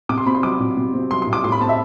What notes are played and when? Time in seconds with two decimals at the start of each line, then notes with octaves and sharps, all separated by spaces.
0.09 C3 D6
0.18 C6
0.26 C4 B5
0.35 C6
0.43 F#3 D6
0.60 C3
0.77 C3
0.94 C4
1.11 F#3 C6
1.22 C6
1.27 C3
1.33 D6
1.44 A2 C6
1.52 B5
1.61 C4 A5
1.69 E5